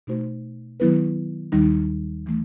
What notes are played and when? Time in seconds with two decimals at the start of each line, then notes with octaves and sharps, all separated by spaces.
0.07 B2 A3 D#4 F#4 C5
0.80 D#3 F#3 B3 E4 B4
1.52 D#2 D#3 G3 D#4
2.26 E3 A3